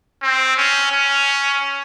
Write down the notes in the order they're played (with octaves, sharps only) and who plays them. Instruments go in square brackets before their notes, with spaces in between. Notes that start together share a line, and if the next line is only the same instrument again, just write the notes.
[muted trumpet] C4
C#4
C#4